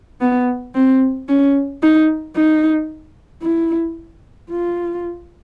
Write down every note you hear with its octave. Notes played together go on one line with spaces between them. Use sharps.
B3
C4
C#4
D#4
D#4
E4
F4